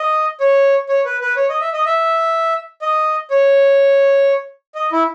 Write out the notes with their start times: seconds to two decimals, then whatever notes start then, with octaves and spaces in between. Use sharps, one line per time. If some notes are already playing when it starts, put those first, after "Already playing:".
Already playing: D#5
0.40 C#5
0.89 C#5
1.05 B4
1.21 B4
1.37 C#5
1.50 D#5
1.61 E5
1.73 D#5
1.86 E5
2.82 D#5
3.31 C#5
4.75 D#5
4.92 E4